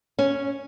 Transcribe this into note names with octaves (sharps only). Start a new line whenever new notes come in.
C#4